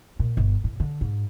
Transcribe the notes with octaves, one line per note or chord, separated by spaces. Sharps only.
A#2
G1
A2
D3
G#2